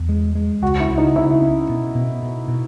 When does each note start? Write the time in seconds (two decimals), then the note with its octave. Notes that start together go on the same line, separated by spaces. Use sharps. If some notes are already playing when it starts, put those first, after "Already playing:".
Already playing: E2
0.09 G#3
0.35 G#3
0.62 C#2 F#4
0.80 E4
0.89 C#2
0.98 D#4
1.16 C#3 E4
1.42 C#4
1.69 B2
1.95 B2
2.23 B2
2.48 B2